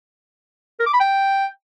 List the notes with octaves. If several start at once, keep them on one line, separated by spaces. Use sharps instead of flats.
A#4
D6
B5
G5